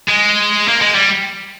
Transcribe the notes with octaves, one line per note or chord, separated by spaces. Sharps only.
G#3
A#3
G#3
G3